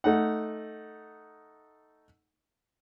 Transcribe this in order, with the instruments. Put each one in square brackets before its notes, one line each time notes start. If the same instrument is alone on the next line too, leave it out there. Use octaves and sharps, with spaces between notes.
[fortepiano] A3 D#4 F#5